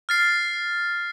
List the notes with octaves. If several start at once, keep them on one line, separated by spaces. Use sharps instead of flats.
F6 A6 C7